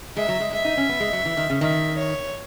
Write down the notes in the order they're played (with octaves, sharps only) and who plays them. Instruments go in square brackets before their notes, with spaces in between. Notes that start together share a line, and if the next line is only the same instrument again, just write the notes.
[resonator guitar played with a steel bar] G#3 [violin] E5
[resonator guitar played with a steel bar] F#3
G#3
[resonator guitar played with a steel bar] G#3 [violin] E5
[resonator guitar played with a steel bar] D#4
C#4
B3
G#3
F#3
E3
D#3
C#3
[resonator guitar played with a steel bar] D#3 [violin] E5
[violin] C#5